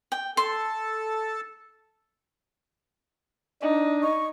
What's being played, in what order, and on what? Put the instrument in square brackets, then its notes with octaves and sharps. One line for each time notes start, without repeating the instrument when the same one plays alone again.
[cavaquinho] G5
[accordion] A4 A5 [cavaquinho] C6
[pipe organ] D4 [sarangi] D#4
[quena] C#6